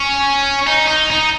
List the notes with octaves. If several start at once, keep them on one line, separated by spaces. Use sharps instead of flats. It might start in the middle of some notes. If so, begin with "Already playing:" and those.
Already playing: C#4
D#4
D#4
D#4